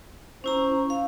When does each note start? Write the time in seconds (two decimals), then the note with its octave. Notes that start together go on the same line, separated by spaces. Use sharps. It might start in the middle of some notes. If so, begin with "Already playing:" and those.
0.44 C#4 E4 C5 A#5
0.90 F5